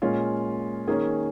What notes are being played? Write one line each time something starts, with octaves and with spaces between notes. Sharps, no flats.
A#2 G#3 C#4 F4
D#3 A#3 C#4 G#4